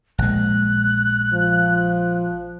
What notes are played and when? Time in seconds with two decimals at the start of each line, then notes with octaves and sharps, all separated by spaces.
0.18 A#1 G#3 F#6
1.34 F3